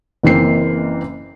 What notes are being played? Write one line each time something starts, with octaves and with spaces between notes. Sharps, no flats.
F#1 E3 A#3 C4 C7